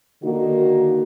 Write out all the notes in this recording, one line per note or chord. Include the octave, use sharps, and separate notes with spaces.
D3 D#3 A#3 D#4 F#4